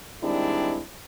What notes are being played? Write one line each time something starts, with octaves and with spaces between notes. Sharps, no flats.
D#3 G3 G#3 C4 D4 E4